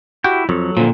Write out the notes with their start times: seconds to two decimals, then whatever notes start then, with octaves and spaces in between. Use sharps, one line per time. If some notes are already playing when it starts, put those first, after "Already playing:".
0.24 E4 F#4 G4 G6
0.49 F2 F#3 A4
0.77 A#2 D3 F3